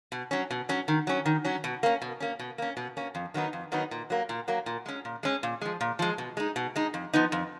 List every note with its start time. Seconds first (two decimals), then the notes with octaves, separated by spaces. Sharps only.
0.12 B2
0.31 F#3 C#4
0.51 B2
0.69 F#3 C#4
0.88 D#3
1.07 F#3 C#4
1.26 D#3
1.45 F#3 C#4
1.64 B2
1.83 A#3 C#4
2.02 B2
2.20 A#3 C#4
2.39 B2
2.58 A#3 C#4
2.77 B2
2.97 A#3 C#4
3.15 F2
3.34 D#3 F#3 B3 D#4
3.53 F2
3.72 D#3 F#3 B3 D#4
3.91 A#2
4.10 F#3 A#3
4.29 A#2
4.48 F#3 A#3
4.66 A#2
4.86 G#3 C#4
5.05 A#2
5.23 G#3 C#4
5.43 A#2
5.62 F3 G#3
5.81 A#2
5.99 F3 G#3
6.18 B2
6.37 G#3 D#4
6.56 B2
6.76 G#3 D#4
6.94 F2
7.14 F3 B3 D#4
7.32 F2